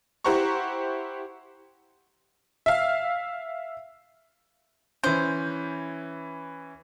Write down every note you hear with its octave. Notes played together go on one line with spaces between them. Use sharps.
E4 G4 C5 F#5 A#5 C#6
E5 F5
E3 C#4 C5